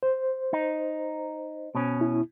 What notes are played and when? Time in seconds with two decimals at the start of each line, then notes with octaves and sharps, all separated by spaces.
0.03 C5
0.53 D#4
1.75 B2 C#4
2.01 E4